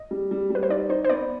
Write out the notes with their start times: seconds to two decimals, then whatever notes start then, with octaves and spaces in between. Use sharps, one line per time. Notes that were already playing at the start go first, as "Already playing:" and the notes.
Already playing: D#5
0.11 G3
0.31 G3
0.50 G3 B4
0.63 C5
0.70 D#4 D5
0.89 D#4 C5
1.05 C5
1.09 B3 D5